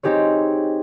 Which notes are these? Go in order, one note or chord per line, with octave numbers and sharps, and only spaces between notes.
C4 D#4 G4 G#4 C#5